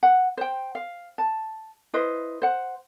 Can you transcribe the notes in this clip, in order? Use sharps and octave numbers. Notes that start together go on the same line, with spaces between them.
F#5
C5 G5
F5
A5
E4 B4 C5 D#5
C5 F#5